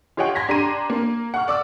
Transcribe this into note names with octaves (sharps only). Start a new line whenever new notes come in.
F4 G4 C#5 D#5 F#5 G5
C6 G#6 A#6 B6
D4 G4 A#5 C6 A#6 D#7
A#3
F#5 C#6 F6
D5 D6 E6